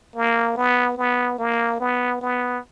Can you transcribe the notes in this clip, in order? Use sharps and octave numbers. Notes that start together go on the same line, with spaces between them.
A#3
B3
B3
A#3
B3
B3